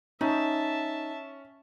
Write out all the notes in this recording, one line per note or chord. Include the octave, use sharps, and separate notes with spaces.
C#4 D#4 E5 A5